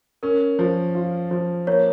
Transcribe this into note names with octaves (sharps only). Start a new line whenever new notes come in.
C#4 A#4
F3
F4
F3
A#3 C#5